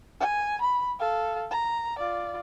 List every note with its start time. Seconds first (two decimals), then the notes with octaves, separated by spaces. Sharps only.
0.20 G#5
0.61 B5
0.99 A4 F5
1.51 A#5
1.98 F4 D5